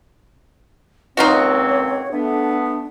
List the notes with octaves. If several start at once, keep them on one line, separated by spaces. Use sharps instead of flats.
C#2 A#2 C4 D#4 F4 F#4 C#5
A3 B3 D4